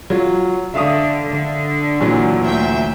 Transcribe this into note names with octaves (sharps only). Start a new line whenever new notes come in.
F#3 F4
D3 E5 F5 D#6
D3
A#2 E3 F#3
D2 E5 G5